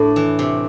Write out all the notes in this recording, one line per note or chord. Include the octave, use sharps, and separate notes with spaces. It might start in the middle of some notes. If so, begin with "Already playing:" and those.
Already playing: A2 D4 E4
E3
C3